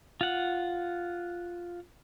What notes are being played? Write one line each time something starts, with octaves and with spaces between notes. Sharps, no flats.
F4 F#5